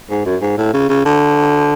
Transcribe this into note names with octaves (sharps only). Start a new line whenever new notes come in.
G#2
F#2
G#2
A2
C#3
C#3
D3